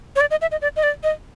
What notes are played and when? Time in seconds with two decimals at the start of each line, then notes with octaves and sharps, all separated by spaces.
0.16 C#5
0.21 D5
0.31 D#5
0.41 E5
0.51 D#5
0.62 D5
0.76 D#5
0.83 D5
1.04 D#5